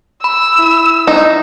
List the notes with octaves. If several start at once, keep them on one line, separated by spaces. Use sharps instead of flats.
B5 E6
E4
D#4